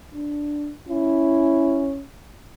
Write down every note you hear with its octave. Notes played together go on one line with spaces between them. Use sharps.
D4
C#4 E4